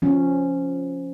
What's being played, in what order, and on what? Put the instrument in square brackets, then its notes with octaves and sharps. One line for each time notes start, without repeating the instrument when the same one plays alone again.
[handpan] F3 C#4